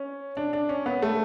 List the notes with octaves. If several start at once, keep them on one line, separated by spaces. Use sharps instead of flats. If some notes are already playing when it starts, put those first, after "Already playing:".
Already playing: C#4
D4
D4
C#4
B3
A3